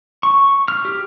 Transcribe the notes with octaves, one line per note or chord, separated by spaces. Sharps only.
C#6
F6
G4